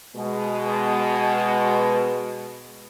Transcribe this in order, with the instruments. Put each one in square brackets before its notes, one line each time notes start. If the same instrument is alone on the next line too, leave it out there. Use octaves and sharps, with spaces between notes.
[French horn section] B2 G#3